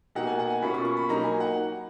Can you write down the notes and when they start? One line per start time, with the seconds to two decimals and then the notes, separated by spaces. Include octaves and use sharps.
0.15 B2 A#3 D#4 F#5
0.27 G#5
0.39 F#5
0.50 G#5
0.62 B2 A#3 C#4 F4 B5
0.74 C#6
0.85 C#6
0.97 B5
1.09 F#3 A#3 D#4 A#5
1.24 G#5
1.40 F#5